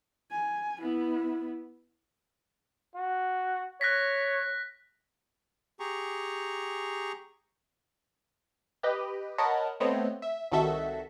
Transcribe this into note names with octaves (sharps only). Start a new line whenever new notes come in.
G#5
B3 E4
F#4
C#5 F#6 A#6 B6
G4 G#4 A#5 C#6
G4 B4 D#5
A#4 C#5 D#5 F#5 A5 B5
A3 B3 C4 C#5 D#5
E5
C2 D#3 F#4 A4 E5 B6